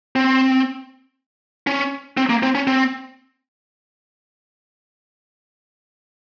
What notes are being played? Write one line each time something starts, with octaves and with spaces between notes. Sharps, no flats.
C4
C#4
C4
A#3
C4
C#4
C4